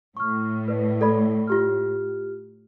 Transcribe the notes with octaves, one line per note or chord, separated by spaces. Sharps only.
A2 C#6 F6
B4 D5
A4 D5 B5
F4 G4 F6